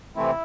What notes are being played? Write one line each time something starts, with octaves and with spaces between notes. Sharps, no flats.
C3 E3 A3 C4 E4